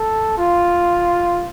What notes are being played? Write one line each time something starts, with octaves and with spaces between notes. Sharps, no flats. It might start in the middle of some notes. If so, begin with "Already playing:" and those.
Already playing: A4
F4